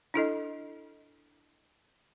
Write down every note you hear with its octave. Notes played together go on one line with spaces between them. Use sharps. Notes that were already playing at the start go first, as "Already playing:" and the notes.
D4 E4 A4 D#5